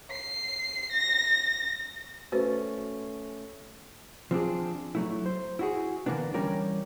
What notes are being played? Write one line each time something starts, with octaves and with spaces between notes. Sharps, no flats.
C7
A#6
A3 C#4 F#4 B4 C5
F3 C4 D4 G#4
F#3 A3 E4
C5
E4 F#4 G#4
D3 E3 A#3 B3 D4
E3 G3 C#4 A#4 C#5 D5